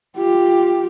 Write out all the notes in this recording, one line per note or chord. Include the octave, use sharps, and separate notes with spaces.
F4 G4